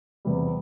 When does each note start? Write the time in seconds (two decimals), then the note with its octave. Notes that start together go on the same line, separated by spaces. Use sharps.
0.25 E2 C3 G3